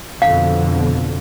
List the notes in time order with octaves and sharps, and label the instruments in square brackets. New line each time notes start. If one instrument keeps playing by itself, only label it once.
[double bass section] F2 B2 D3 [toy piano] F5